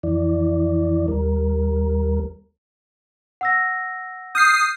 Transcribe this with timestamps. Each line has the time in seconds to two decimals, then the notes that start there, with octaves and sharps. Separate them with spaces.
0.03 F2 E3 E4 D5
1.08 D#2 G3 A#4
3.41 F#5 E6 A#6
4.35 D#6 F6 G6 C7